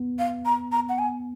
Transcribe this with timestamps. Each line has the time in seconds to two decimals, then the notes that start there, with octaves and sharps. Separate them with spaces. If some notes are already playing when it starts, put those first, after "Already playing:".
Already playing: B3
0.19 F5
0.45 A#5
0.72 A#5
0.89 F#5
0.99 G#5